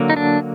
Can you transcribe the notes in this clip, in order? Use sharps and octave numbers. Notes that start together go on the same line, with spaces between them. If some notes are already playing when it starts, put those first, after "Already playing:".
Already playing: D3 F#3 A#3
D#4
D4